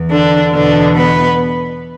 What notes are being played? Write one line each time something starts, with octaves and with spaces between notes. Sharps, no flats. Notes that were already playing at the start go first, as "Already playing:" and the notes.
Already playing: E2
D3 D4
E2 B2 D3 D4
B3 B4